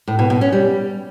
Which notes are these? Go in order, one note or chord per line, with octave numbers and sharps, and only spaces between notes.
A2
B2
B2
C#4
G3